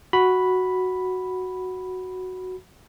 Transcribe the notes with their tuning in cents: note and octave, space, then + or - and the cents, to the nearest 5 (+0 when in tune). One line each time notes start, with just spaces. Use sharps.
F#4 +0 B5 +0